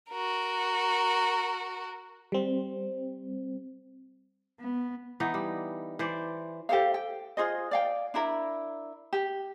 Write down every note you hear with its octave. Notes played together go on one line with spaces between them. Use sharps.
F#4 A#4
G3 C4
B3
E3 B3 D#4
G3
E3 C5 D5
G4 A4 C5 F5
G5
F4 G#4 C5 D#5
D5 F5 G5
D4 E4 A#4 B5
G4